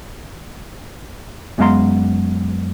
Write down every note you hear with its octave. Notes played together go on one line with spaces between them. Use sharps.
F#2 G#3 B3 F5 A#5 C6